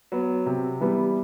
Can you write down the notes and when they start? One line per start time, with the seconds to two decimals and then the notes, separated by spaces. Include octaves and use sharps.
0.12 F#3 B3
0.46 C3
0.81 E3 G3 B3